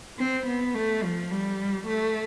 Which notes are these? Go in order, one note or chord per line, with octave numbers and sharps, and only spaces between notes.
C4
B3
A3
F3
G3
A3